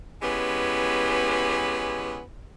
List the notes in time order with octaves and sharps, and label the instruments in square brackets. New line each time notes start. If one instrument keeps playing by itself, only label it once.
[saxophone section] E3 G#3 B3 C#4 G4